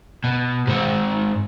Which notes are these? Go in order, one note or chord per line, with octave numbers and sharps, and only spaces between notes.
B2
G#2 C4